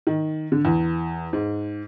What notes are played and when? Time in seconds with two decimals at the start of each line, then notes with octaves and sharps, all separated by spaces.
0.07 D#3
0.52 D3
0.65 E2
1.33 G#2